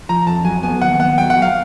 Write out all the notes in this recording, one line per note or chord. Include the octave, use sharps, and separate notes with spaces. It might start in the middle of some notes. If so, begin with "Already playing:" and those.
F3 A#5
F2 A5
F#3 G#5
B3 G#5
D#2 F#5
B3 F#5
F#3 G5
F#5
F#3
F5